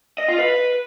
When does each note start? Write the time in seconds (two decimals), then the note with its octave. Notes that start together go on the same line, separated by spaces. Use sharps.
0.18 D#5
0.28 F4
0.39 B4